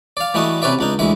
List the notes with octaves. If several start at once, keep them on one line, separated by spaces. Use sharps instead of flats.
D5 F5
E3 G3 A3 F#4 A4 D#5
C3 C#4 B4 D5 E5
C#2 D4 D#4
D2 E3 G#3 E5